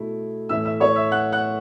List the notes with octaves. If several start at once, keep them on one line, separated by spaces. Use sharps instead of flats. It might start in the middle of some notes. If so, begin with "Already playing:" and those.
Already playing: B2 A3 E4
A2 E3 A3 C#4 E5 E6
E5 E6
C#5 C#6
E5 E6
F#5 F#6
F#5 F#6